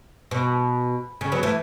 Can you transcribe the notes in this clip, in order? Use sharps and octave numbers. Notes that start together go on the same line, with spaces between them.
B2
C#3
F#3 B3
E3 A3